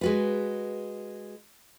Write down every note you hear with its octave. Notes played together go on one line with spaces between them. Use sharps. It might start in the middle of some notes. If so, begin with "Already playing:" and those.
G#3 F#4 B4